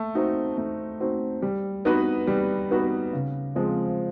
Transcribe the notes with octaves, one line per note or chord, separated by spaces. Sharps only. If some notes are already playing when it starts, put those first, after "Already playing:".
Already playing: A3
C4 D#4 F#4
A3
C4 D#4 F#4
G3
B3 D#4 F#4 B4
G3
B3 D#4 F#4 B4
C#3
F3 G#3 C4 F4